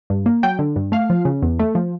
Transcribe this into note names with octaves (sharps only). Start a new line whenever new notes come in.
G2
A#3
F#3 G5
D3
G2
A3 F5
F3
C#3
E2
A3
F3